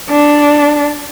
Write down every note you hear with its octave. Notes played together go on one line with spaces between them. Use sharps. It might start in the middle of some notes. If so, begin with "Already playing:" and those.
D4